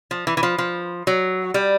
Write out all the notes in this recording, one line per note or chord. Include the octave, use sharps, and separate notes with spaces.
F3
E3
E3
F3
F3
F#3
G3